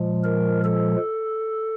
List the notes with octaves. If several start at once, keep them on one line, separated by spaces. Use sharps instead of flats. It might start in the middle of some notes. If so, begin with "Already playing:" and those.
Already playing: A#2 F3 G#3
A#4
A4